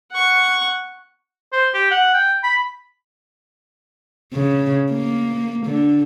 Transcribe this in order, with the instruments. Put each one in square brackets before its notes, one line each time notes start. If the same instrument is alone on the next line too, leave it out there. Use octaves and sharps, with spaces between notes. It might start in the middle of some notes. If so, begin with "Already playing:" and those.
[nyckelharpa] F#5 C#6
[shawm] C5
G4
F#5
G5
B5
[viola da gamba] C#3
A#3
D3